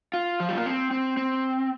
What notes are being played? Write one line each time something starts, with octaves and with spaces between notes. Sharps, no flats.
F4
F3
G3
A#3
C4
C4
C4